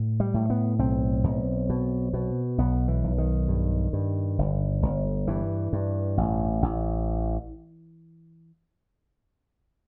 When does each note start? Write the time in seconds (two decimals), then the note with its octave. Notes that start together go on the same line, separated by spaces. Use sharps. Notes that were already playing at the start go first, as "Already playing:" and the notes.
Already playing: A2
0.20 G3
0.34 A2
0.50 B3
0.79 B1 C4
1.24 B1
1.70 B2
2.13 B2
2.58 B1 B3
2.88 E3
3.04 B1
3.18 D#3
3.48 G2
3.93 G2
4.38 G1
4.82 G1
5.27 G2 E3
5.73 G2
6.17 A1
6.62 A1